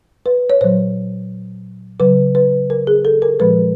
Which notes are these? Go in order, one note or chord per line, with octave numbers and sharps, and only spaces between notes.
B4
C#5
A#2 F#3 C5
C#3 F#3 B4
B4
A#4
G#4
A4
A#4
A#2 F3 G#3 B4